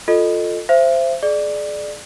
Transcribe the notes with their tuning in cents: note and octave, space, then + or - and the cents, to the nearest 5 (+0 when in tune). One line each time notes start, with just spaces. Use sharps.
F4 +20 A4 +10 D#5 -15
C5 +0 E5 +35
G#4 +35 D5 +15